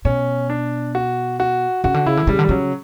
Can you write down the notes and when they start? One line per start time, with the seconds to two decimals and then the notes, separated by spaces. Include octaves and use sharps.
0.05 B2 C#4
0.50 D4
0.95 F#4
1.40 F#4
1.84 C#3 F#4
1.94 D3
2.06 C#3 E4
2.17 D3
2.27 C#3 G3
2.39 D3
2.44 G3
2.49 C#3 F#3